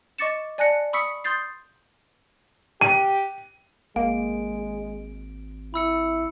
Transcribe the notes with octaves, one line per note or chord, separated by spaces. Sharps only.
D#5 C#6 D6 A6 C#7 E7
D5 G#5 A5 F#6 A#6 C#7
B5 C#6 D#6 E6 B6 C#7
C6 D#6 G6 A6 C7
G4 D#7
G#1 G#3 A#3 D7
E4 B5 E6 C#7